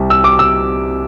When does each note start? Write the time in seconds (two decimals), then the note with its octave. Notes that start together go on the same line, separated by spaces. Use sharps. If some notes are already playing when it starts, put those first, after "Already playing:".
Already playing: C2 C3 G3
0.10 E6
0.24 D6
0.39 E6